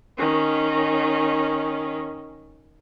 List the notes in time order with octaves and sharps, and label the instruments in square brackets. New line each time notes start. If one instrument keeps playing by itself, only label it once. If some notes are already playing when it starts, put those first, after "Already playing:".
[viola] D#3 C#4